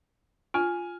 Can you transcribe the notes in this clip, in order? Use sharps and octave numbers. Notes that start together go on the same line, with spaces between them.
F4 G#5 F6